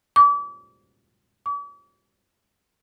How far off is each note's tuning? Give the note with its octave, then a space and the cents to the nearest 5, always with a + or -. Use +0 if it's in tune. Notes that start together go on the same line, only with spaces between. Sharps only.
D6 -35
D6 -45